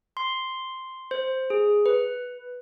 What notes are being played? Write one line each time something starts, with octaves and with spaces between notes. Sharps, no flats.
C6
C5
G#4
B4